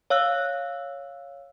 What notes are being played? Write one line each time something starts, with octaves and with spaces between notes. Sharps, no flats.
C#5 F5 E6 F#6